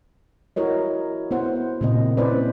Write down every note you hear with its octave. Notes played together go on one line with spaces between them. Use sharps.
E4 F#4 A#4 C#5 D#5
B3 E4 C5 F#5
A#2 C#3 A#3 C4 D#5
C4 C#4 E4 B4 C5 D5